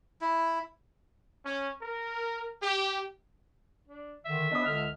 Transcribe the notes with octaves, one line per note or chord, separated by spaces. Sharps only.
E4
C#4
A#4
G4
D4
D3 D#3 E5
B3 D4 D#5 D#6
C#2 D3 F6